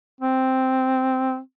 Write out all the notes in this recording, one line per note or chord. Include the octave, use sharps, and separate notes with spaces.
C4